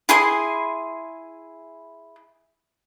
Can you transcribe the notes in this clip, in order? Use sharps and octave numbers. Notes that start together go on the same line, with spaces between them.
E4 G#4 G#5 C6